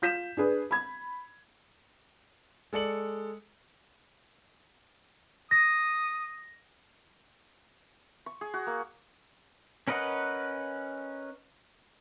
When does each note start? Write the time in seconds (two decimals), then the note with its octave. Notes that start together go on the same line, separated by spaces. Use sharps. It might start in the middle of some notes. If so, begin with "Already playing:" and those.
0.02 F4 G6 B6 E7
0.37 D4 G#4 B4
0.71 B5 G#6
2.73 G#3 A4 D5 C#7 F#7
5.51 D#6 A#6
8.26 C#6
8.41 G#4
8.54 F#4
8.67 A#3
9.88 C#4 A#4 B4 D#5 F#5